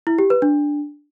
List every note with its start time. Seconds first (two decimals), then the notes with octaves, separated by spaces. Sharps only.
0.07 E4
0.18 G4
0.30 B4
0.42 D4